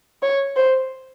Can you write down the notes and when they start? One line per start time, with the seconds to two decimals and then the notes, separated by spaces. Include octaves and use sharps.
0.23 C#5
0.56 C5